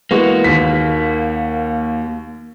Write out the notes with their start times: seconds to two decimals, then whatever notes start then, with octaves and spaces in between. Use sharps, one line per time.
0.11 E3 G#3 A#3 B3 F#4
0.44 D#2 B6